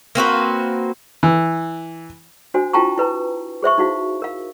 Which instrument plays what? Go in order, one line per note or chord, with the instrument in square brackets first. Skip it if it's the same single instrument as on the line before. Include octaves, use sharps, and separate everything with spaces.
[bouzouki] A#3 C4 F#4 B4
[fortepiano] E3
[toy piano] D4 F#4 C5 G#5
E4 F4 G5 A5 A#5 C#6
E4 B4 A#5
G#4 C5 E5 C#6
D#4 E4 F#4 F5
A#4 F5